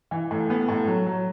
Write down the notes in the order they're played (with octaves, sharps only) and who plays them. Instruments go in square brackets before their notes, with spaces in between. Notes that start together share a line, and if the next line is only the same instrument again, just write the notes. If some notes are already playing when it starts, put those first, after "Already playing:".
[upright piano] E3
A2
B3
A2
F#3
F#3